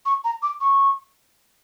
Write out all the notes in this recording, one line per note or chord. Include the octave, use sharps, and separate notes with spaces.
C#6
A#5
D6
C#6